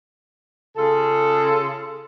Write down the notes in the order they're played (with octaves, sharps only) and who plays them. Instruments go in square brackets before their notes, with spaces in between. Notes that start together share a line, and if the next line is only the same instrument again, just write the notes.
[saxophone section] C#3 F4 G#4 A4